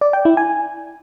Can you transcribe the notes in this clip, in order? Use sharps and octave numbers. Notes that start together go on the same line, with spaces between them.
D5
G5
E4
G#5